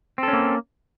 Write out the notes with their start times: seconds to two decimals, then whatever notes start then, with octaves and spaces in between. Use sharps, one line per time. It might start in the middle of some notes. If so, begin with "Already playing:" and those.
0.18 C4
0.23 A4
0.28 C#4
0.33 A#3